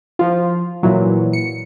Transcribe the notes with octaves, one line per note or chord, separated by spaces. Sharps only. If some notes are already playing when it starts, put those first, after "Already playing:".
F3 F4
A#2 E3 F#3
C#7